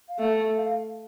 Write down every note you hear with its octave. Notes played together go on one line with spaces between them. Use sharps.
F5
A3 E5
F5